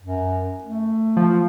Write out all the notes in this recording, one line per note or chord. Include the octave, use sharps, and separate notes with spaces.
F#2
A3
F3